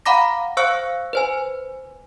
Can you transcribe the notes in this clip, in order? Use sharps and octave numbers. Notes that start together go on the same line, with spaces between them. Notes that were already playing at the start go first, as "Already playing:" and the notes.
F5 F#5 A#5 B5 D6 A#6
C5 F5 C#6 E6 F#6 C#7
B4 C5 G#5